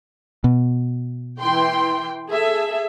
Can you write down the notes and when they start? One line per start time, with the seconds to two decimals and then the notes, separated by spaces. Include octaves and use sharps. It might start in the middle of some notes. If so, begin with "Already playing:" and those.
0.44 B2
1.42 E3 G5 C6
2.31 G#4 A4 E5